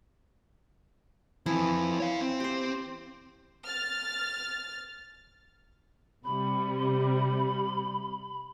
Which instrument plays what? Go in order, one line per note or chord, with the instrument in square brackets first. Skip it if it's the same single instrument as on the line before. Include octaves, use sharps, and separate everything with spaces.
[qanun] E3 E4 [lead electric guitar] F3 C4
[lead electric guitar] C#5 F5
C4
[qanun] G4 C5
[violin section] F6 A6
[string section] C3 G3 [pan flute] B5